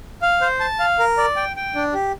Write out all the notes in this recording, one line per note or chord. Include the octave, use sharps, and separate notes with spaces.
F5
C5
A5
F5
A#4
D5
G5
G5
D4
G4